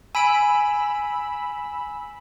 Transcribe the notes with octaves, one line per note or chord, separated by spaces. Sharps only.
G#5 B5 E6 D7